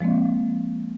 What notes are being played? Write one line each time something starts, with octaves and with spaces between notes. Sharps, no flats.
F3 G#3 A#3 C4